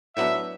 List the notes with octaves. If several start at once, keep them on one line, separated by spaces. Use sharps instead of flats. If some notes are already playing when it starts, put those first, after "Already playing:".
A2 F#3 B3 D4 E5